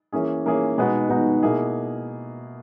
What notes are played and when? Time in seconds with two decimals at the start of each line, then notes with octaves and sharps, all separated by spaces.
0.12 E3 A#3 C#4 G#4
0.46 E3 A#3 C#4 G#4
0.78 B2 G#3 B3 D#4 F#4
1.09 B2 G#3 B3 D#4 F#4
1.43 B2 A#3 E4 G#4